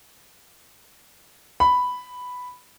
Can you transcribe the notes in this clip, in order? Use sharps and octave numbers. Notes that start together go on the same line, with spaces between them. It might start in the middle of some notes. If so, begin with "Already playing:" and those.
B5